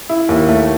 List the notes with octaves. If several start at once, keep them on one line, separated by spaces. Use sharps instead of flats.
E4
D#2
A3